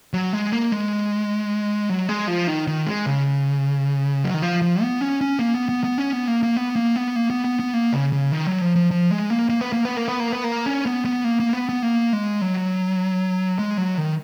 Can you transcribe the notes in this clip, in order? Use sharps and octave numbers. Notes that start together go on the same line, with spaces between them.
F#3
G#3
A#3
G#3
F#3
G#3
F3
D#3
D#3
G#3
C#3
F#3
D#3
F3
F3
B3
C#4
C#4
A#3
B3
B3
B3
C#4
B3
A#3
A#3
B3
A#3
B3
A#3
B3
B3
B3
A#3
C#3
C#3
D#3
F#3
F3
F3
F3
G#3
A#3
A#3
B3
A#3
B3
A#3
B3
A#3
B3
A#3
C#4
B3
B3
A#3
A#3
B3
B3
A#3
G#3
F#3
G#3
F#3
D#3